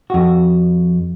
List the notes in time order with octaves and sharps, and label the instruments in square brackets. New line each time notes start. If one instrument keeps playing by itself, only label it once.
[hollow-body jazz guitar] F2 F#4